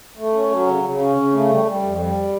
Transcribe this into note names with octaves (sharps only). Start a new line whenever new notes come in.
A3
C#4
F#3
C#3
C#3
C#4
C#3
A3
G3
G3
F2
G3